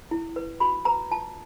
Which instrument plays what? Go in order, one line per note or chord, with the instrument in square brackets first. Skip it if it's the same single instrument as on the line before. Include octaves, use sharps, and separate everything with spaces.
[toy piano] E4
B4
F#4 B5
B4 A#5
F4 A5